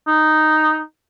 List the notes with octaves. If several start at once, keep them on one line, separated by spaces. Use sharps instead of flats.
D#4